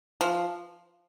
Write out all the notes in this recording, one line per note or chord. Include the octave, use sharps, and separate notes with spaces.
F3